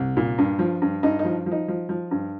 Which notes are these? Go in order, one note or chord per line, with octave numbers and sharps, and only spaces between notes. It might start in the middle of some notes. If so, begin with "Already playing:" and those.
Already playing: C2
A#2
G2
F3
G2
G2 D#4
D#4
F3
F3
D#4
F3
F3
G2